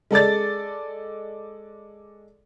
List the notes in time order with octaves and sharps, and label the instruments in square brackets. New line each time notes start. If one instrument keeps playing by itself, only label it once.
[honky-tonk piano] G#3 A4 D5 A6